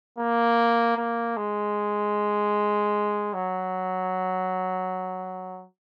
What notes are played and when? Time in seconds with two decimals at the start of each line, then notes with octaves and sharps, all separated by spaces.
0.19 A#3
0.97 A#3
1.37 G#3
3.33 F#3